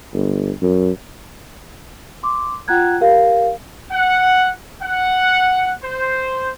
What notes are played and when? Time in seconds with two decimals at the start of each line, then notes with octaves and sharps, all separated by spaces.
0.13 G1
0.62 F#2
2.23 C6 D6
2.68 F4 F#5 G5 A#5 F#6 G#6
3.01 G4 A#4 F5
3.91 F#5
4.82 F#5
5.83 C5